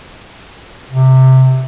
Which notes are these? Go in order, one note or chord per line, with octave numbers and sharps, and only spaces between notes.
C3